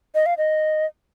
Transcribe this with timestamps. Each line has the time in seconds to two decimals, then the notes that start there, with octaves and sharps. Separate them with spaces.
0.15 D#5
0.26 F5
0.38 D#5